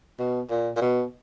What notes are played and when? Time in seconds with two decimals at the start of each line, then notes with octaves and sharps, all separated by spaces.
0.19 B2
0.50 A#2
0.76 A#2
0.81 B2